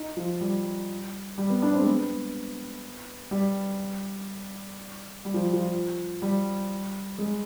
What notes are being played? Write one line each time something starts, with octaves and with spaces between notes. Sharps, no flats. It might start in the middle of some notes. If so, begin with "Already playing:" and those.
Already playing: D#4
F3
G3
G3
B3
D4
C4
G#3
B3
G3
G3
F3
F3
G3
G#3